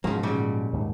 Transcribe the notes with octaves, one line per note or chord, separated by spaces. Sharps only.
G#2 C#3 F3 F#3 A#3
A#2 C#3 G3
D#2 G#2